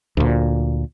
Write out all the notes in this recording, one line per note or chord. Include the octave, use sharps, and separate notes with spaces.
D2 A#2